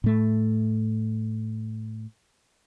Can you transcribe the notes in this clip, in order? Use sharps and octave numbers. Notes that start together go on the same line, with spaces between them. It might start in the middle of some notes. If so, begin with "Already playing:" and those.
A2 A3